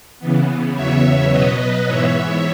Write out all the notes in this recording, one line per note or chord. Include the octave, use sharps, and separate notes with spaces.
C#3 E3 B3
E2 C#3 F#3 B3 C#5 E5
B2 F#3 B3 B4 D#5
G#2 E3 B3 C#5 E5